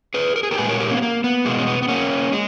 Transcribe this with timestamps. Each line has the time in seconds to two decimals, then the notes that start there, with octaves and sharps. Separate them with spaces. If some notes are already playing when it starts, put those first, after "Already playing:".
0.14 G#4 B4
0.36 A#4
0.43 G#4
0.51 G4 A#4
0.58 A#2 G#3 G#4 B4
0.69 A#4 C#5
0.80 G4 A#4
0.90 A#3 C#4
0.97 B3
1.02 A#3
1.24 B3
1.45 B2 G#3 A#3
1.58 C#4
1.67 B3
1.83 B3
1.88 A#3 C#4
2.32 G#3